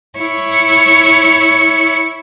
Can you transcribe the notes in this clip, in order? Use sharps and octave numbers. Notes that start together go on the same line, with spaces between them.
E4 C#5